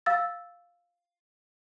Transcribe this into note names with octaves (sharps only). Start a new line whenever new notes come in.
F5 E6 A6